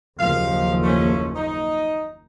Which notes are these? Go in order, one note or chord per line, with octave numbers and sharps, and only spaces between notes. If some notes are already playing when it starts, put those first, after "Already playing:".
F#1 D#2 F3 F5
A3 C#4
D#4